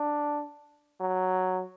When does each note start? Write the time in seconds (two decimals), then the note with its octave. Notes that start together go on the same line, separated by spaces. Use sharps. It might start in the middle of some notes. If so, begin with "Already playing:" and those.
Already playing: D4
1.00 F#3